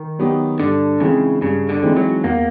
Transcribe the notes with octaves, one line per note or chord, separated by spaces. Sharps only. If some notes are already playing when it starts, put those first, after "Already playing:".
Already playing: D#3
F#3 B3 D#4 G4
G2 D3
C#3 E3 G#3 C4 D#4
G2 C#3
D3
E3 G#3 C4 D#4
F#3
E2 A#3